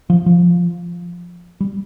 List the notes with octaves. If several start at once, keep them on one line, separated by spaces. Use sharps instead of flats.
F3
F3
G3